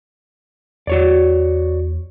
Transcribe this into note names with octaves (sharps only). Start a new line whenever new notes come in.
E2 F#4 C#5 D5